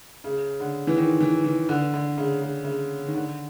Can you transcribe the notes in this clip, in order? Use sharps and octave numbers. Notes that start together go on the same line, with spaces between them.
C#3
D3
E3
D#3
E3
E3
D3
D3
C#3
C#3
C#3
D#3
D3